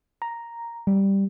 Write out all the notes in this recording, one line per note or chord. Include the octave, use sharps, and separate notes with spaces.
A#5
G3